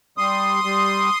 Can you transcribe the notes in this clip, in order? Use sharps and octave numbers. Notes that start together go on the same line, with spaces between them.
G3 C6 D#6
G3